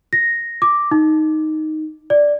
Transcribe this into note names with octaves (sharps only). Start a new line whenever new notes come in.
A#6
D6
D#4
D5